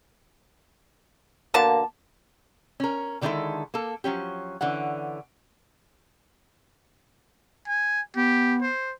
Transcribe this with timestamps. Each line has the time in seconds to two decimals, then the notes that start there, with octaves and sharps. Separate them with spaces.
1.54 B2 D3 A#3 A5
2.80 C#4 A#4
3.21 D3 D#3 G3 G#3 E4 A4
3.74 A#3 A4
4.04 F3 F#3 C#4 G4
4.61 D3 E3 C#4 F#5
7.68 G#5
8.16 B3 G4
8.62 C5